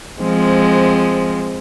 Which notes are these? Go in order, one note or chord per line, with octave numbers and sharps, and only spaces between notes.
F3 G#3 C4